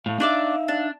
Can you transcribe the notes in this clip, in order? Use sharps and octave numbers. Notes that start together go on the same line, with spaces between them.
A2 A3 F5
D4 D#4 D5 E5 D6
D4